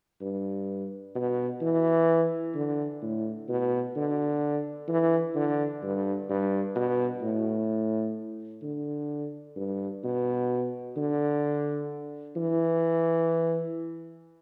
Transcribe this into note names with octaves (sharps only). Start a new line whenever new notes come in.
G2
B2
E3
D3
A2
B2
D3
E3
D3
G2
G2
B2
A2
D3
G2
B2
D3
E3